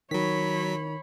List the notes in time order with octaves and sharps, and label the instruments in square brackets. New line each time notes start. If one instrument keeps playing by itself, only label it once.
[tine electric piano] D#3 [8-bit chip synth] F#3 B6 [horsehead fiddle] C#5 B5